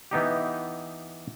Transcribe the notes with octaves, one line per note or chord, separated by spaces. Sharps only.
E3 B3 D#4 G4